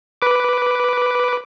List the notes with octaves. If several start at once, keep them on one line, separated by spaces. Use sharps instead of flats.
B4 D6